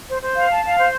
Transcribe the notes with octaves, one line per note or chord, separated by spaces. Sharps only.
C5
C5
F5
A5
F5
C5